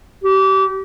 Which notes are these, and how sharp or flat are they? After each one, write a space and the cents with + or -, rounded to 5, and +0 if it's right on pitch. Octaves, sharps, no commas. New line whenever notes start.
G4 -30